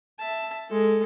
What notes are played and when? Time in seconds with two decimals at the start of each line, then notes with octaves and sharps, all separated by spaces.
0.20 E5 A5
0.69 G#3 A4